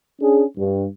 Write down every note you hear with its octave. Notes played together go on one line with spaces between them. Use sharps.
C#4 D4 G#4
G2